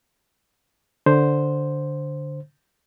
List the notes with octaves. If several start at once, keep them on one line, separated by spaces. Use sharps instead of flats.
D3 C5